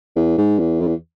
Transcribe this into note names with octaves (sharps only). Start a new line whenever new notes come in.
E2
G#2
E2
F2
E2